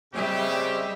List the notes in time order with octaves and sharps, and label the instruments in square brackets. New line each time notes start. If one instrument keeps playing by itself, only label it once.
[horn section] C#3 C4 G4 [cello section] G3 D#5 E5